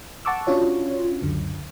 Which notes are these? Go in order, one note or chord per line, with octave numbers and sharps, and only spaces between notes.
F#5 A5 C#6 D6 E6
C#4 D4 F4 F#4 C#5
C#2 F#2 D3